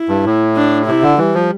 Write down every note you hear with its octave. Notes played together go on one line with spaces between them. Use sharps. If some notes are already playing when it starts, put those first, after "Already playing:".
Already playing: E4
G2
A2
D4
C3 E4
D3
E3 G3
F3